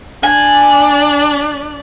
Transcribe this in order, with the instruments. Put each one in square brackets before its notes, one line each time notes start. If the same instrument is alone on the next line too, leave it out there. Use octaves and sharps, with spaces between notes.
[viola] D4 D5 [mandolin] G#5